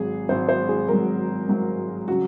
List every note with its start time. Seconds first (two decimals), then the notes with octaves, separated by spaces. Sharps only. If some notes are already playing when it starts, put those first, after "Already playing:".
Already playing: G#1 F#3 G#4
0.29 G#1 G#2 F#3 C5
0.49 C5
0.69 G#4
0.88 G#1 G#2 F#3 A#4
1.48 G#1 G#2 F#3
2.08 C#3 F#3 F#4